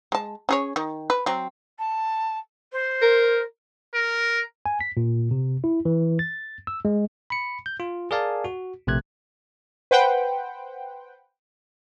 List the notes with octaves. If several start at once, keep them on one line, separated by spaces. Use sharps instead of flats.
G#3 A5
C#4 G#4 C#5
D#3
B4
F#3 C4
A5
C5
A#4
A#4
G#5
B6
A#2
C3
E4
E3
A6
E6
G#3
B5 C#7
G6
F4
G#4 A#4 D5 F5 G#5 A5
F#4
A#1 C3 A3 F#6 G#6
B4 C5 F#5 G5